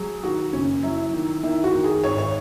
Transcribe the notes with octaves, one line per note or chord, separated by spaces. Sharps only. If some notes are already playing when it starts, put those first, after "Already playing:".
Already playing: F#3 G#4
D#3 F#4
F#1 C#4
F#3 E4
D#3
D#3 E4
F#4
D#3
G#4
G#1 C#5
C#5